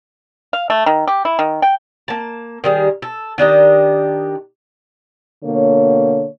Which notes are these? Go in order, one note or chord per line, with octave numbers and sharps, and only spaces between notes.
F5
A3
D#3
G4
E4
D#3
G5
A#3 A5
D#3 G3 G#4
A4
D#3 D4 G4 D#5
B2 D3 A#3 C#5